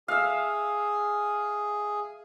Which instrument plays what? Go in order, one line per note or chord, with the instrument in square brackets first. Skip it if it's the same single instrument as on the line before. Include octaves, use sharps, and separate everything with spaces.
[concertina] G#4 [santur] E5 F5